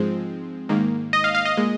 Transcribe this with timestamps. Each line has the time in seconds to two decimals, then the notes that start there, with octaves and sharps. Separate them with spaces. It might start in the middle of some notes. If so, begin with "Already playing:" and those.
Already playing: G#2 F3 G#3 C4
0.69 G#2 D#3 A#3
1.13 D#5
1.24 F5
1.35 F5
1.45 D#5
1.57 A#2 G#3